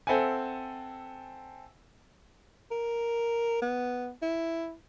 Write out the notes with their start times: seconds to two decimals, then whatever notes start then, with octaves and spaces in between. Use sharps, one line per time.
0.07 C4 A4 E5 F#5 G#5
2.71 A#4
3.62 B3
4.22 E4